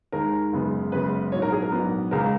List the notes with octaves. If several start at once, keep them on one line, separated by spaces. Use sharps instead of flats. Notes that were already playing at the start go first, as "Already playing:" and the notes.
D#2 D#3 G#3 A#4
F#1 F#2 C#3 G#3 B3
F#1 F#2 C#3 G#3 B3 B4
A#1 G#2 F#3 B3 C#5
A#4
G#4
A#4
A#1 G#2 F#3 B3
C#2 C#3 G#3 A#4